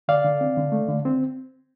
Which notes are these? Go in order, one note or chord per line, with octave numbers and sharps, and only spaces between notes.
D3 D5 F5
D3
C4
D3
A3
D3
C4